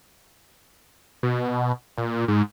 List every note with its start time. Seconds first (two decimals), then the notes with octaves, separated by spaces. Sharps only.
1.23 B2
1.98 A#2
2.28 G#2